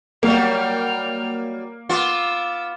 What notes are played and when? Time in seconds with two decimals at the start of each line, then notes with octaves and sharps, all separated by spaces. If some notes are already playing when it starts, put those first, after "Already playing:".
0.23 F#3 G3 A#3 G5 F6
1.89 B3 F4 D6 E6